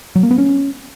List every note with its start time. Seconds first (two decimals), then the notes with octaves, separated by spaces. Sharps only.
0.16 F#3
0.23 A#3
0.31 B3
0.38 C#4